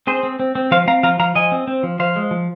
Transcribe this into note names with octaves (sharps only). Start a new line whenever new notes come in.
C4 G#4 C5
C4
C4
C4
F3 C5 F5
C4 F5 A#5
F3 F5 A#5
F3 F5 A#5
F3 D#5 G#5
C4
C4
F3
F3 C5 F5
G#3
F3